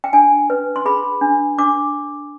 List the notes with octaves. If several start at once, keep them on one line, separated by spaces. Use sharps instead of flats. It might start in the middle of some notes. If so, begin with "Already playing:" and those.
G5
D4 G#5
B4
C6
G#4 B5
D4
D4 D6